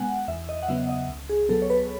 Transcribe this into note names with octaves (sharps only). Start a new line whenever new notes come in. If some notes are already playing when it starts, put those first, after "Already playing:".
Already playing: B2 G#3 B3 F#5 G#5
E2 E5
D#5
F#5
C#3 F#3 B3 E5
D#5
C#2
G#4
B2 F#3 B3 A4
C#5
B4